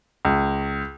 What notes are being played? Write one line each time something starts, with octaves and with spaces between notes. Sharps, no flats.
C#2